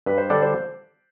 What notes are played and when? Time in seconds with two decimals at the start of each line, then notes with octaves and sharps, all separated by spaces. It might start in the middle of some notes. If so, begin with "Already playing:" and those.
0.06 G2 B4
0.18 C5
0.30 D3 G3 D4 A4 D5
0.42 C5